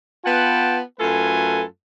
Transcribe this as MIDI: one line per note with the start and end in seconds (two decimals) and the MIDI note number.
0.25 0.80 59
0.25 0.80 65
0.25 0.80 71
0.25 0.80 78
0.25 0.80 79
0.25 0.80 81
0.99 1.63 42
0.99 1.63 57
0.99 1.63 65
0.99 1.63 69
0.99 1.63 71
0.99 1.63 80